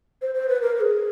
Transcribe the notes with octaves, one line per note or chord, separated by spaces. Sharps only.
C5
C5
B4
A#4
A#4
G#4